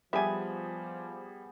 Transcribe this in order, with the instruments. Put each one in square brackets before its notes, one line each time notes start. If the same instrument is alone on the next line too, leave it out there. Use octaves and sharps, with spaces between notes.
[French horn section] F3 [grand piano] G3 [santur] B3 G4 G#4 [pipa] E5 G#5